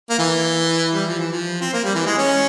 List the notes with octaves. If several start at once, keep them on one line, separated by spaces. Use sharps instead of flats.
A#3
E3
G3
F3
E3
F3
C4
A#3
G3
E3
G#3
C#4